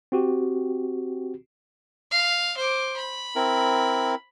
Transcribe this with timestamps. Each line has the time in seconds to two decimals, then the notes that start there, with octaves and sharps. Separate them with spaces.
0.12 C4 F#4 G4
2.11 F5
2.57 C5 D6
2.96 B5
3.36 C4 E4 A#4